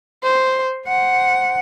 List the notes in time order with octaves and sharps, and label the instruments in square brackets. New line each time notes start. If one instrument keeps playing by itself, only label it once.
[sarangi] C5
[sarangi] C5 [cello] F#5